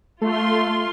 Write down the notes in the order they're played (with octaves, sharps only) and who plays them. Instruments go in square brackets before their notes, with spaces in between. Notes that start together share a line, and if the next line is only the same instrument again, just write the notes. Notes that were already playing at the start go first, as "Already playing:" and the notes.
[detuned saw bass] A3 [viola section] F4 C6